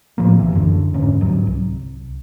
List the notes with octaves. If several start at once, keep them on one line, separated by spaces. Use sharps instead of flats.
A2 F3 A#3
B1 E3
F#2 D3
E2 G#2 D3 C#4
G#2 F#3
C2